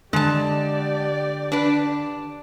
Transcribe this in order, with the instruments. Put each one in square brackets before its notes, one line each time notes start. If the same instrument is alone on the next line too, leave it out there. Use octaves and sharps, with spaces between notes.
[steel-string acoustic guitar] D3 [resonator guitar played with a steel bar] G#3 A5 [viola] G4 D5
[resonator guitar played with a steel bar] D4 B4